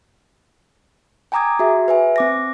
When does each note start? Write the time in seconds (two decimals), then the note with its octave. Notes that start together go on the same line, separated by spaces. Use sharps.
1.32 G5 G#5 A#5 D6 D#6 G#6
1.59 F#4 G#4 E5
1.88 B4 E5 G#5
2.16 C4 D6 A#6